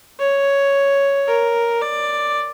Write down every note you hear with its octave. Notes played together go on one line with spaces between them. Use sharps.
C#5
A#4
D5